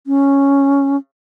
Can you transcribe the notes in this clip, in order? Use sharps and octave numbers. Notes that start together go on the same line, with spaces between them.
C#4